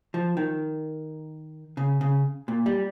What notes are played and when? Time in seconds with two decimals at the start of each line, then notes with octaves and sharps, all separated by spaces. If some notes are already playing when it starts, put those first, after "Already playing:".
0.14 F3
0.37 D#3
1.77 C#3
2.01 C#3
2.48 A#2
2.66 G3